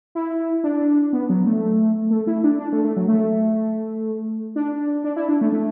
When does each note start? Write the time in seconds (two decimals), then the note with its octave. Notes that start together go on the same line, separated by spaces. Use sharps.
0.15 E4
0.64 D4
1.13 B3
1.29 F#3
1.46 A3
2.11 A3
2.27 E4
2.44 D4
2.60 D4
2.72 A3
2.84 A3
2.96 F#3
3.08 A3
4.56 D4
5.04 D4
5.16 E4
5.29 D4
5.41 A3
5.52 A3